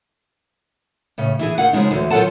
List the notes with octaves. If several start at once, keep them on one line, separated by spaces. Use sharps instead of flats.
A2 C#3
E3 E4 G#4
D#3 F5 F#5
C#3 F3 G#3 D#4
D2 E3 C5
D#3 F#3 F4 A4 F#5 A5